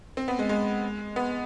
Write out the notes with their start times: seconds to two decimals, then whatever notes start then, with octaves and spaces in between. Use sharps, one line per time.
0.17 C4
0.28 B3
0.39 G#3
0.49 G#3
1.16 B3